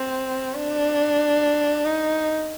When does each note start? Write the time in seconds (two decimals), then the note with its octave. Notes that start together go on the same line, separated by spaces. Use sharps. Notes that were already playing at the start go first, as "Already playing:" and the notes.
Already playing: C4
0.54 D4
1.85 D#4